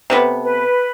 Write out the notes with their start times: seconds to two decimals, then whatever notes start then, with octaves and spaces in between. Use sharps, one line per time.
0.10 C3 A3 B3
0.44 B4